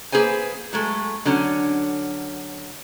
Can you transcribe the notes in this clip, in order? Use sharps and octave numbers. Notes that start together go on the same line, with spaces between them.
A#3 G#4 B4 C5 G#5
F#3 G#3 A3
D3 F#3 C#4